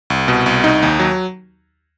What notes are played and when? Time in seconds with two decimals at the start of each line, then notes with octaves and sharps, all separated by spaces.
0.10 C2
0.28 B2
0.46 C2
0.64 D#4
0.82 D#2
0.99 F#3